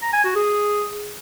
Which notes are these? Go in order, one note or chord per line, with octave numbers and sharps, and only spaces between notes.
A#5
G#5
F#4
G#4